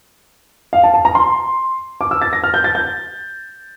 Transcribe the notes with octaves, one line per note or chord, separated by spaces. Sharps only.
F5
A5
A5
A#5
C6
D6
E6
A6
A#6
F6
G6
A6
G6